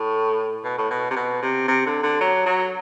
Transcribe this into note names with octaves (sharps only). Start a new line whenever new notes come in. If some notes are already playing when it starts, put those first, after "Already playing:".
Already playing: A2
B2
A2
B2
C3
B2
C3
C3
D3
D3
F#3
F#3